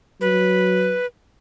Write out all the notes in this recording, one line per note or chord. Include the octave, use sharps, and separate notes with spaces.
F#3 B4